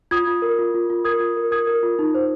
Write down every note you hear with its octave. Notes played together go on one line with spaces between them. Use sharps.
F4 D#6 G#6
F4
A#4
F4
F4
F4
A#4 D#6 G#6
F4
A#4
A#4 D#6 G#6
A#4
F4
D#4
C5